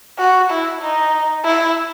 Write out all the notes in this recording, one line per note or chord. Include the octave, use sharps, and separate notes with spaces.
F#4
E4
D#4
E4